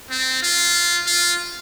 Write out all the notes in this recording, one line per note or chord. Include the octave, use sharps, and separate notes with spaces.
C4
F4
F4